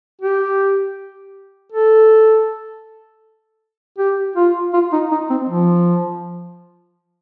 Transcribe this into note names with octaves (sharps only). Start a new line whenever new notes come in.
G4
A4
G4
F4
F4
D#4
D#4
C4
F3